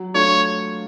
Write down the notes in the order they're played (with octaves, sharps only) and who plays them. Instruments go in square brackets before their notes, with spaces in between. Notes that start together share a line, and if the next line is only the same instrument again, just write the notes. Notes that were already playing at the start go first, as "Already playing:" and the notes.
Already playing: [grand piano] F#3
[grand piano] A3 D4 F4 [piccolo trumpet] C#5